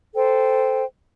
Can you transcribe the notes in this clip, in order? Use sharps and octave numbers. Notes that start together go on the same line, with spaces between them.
A4 C5 G5